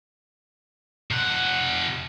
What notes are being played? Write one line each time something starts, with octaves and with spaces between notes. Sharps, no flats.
C3 F#5